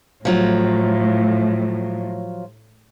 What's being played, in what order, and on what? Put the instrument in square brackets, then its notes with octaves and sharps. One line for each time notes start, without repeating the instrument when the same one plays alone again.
[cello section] A2 [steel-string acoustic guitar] F3 F#3 F4